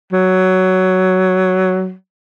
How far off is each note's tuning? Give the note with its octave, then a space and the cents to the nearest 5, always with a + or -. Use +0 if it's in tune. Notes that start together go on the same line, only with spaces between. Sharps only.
F#3 +10